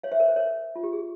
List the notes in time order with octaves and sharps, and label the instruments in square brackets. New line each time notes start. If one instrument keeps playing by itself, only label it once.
[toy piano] C#5 F5
C5 E5
A#4 C#5
C5
A#4 C#5
F4
G4
G#4